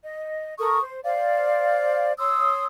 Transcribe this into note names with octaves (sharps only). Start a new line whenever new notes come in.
D#5
A4 A#4 C#6 D#6
C5
C5 D5 F5
C#5 C6 D#6 E6